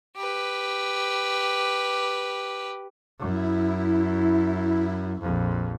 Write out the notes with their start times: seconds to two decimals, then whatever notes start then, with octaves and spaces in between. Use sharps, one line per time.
0.16 G4 B4
3.19 F#2 E4
5.20 A#1 F2